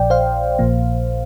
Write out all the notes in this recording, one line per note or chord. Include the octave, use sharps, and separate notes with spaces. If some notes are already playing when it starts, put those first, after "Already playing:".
Already playing: A#1 A#2 F3 D5 G5
C5 F5
A#1 A#2 F3 A#3